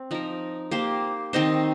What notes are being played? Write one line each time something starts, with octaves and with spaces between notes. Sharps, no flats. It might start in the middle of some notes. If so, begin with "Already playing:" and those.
Already playing: C4
F3 D#4 A#4
A#3 G4 C5
D#3 C4 D#4 C5